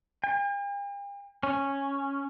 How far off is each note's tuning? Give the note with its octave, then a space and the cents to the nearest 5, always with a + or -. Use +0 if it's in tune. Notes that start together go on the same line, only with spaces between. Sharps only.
G5 +45
C#4 -5